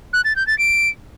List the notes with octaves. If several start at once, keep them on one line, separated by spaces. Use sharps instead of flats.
F#6
A6
G6
A6
D7